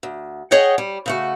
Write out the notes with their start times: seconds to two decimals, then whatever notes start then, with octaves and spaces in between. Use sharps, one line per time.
0.03 D2
0.51 G#4 C#5 D#5 F#5 G5
0.78 G3
1.06 C#3 A3 F#4